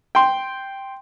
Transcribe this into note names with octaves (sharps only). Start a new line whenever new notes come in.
G5 C6